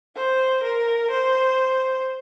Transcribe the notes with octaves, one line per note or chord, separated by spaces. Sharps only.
C5
A#4
C5